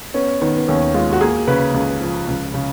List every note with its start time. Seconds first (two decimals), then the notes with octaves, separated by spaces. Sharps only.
0.14 B3 C#4
0.41 D#3 B3
0.57 B3
0.68 D#2 C#4
0.94 G#3 F4
1.13 F#4
1.21 A#3 G#4
1.47 C#3 B4
1.74 C#2
2.01 F3
2.28 C#2
2.54 C#3